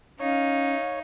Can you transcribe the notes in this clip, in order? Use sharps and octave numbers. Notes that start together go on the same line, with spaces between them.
C#4 D#4 C#5 F5